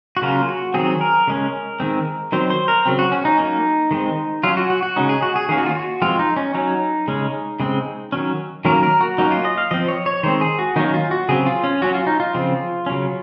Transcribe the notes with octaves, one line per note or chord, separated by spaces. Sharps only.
F#4
C#3 F#3 A#3 C#4 F4
F#4
D#3 F#3 C4 G#4
A#4
C#3 G#3 C#4
D#3 G#3 C4
D#3 F#3 C4 C5
C5
A#4
C#3 F#3 C4
F#4
C#4
D#4
F#3 A#3 C#4
D#3 G#3 C4
F#3 C#4 F4
F#4
F#4
F#4
C#3 G#3 C#4 D#4
G#4
F#4
G#4
D#3 A#3 C#4 G#4
F#4
F4
F#4
F3 G#3 C4 F4
D#4
C#4
F#3 C#4 D#4
C#3 G#3 C#4
C#3 G#3 C4
D#3 F#3 C#4
D#3 F#3 A#3 C#4 A#4
A#4
F#4
F#3 A#3 C#4 D#4
F4
D#5
F5
F3 C4 D#5
C#5
C#5
D#3 G#3 C4 C5
G#4
F#4
D#3 F#3 A#3 C#4 D#4
F4
F#4
C#3 F#3 C4 G#4
F4
C#4
F#3 C#4 F#4
F4
D#4
F4
C#3 F3 C4
C#3 F#3 C#4